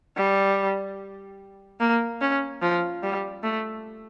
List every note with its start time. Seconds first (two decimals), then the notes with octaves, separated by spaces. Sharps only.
0.17 G3
1.80 A#3
2.21 C#4
2.62 F3
3.03 G3
3.43 A3